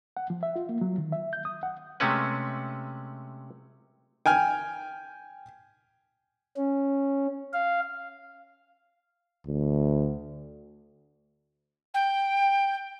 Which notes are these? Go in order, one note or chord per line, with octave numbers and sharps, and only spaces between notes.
F#5
F3
E5
F4
A#3
F#3
D#3
E5
G6
D#6
F#5
C3 G#3 A3 C#4 B4
G5 G#5 F6
C#4
F5
D2
G5